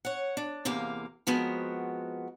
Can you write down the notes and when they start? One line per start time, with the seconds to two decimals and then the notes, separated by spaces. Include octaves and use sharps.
0.05 C#5 F#5
0.37 D4
0.65 E2 C3 A#3 F5
1.27 F3 G#3 B3 C4 F#4 A#4